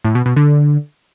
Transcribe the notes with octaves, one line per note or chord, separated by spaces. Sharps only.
A2
B2
B2
D3